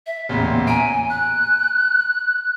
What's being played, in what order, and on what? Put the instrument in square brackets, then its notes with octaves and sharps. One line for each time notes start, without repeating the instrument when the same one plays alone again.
[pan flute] E5
[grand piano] A1 E2 A#2
[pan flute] G#5 [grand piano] A#5 D7
[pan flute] F#6